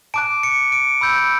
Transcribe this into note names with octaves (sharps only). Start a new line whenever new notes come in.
A5 D6 F#6 D7
C#7
D7
B5 E6 G6